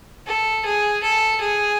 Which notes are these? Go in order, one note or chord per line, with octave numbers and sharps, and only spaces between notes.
A4
G#4
A4
G#4